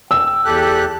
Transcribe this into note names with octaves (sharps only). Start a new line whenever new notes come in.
G5 E6
E2 G4 A4 F#6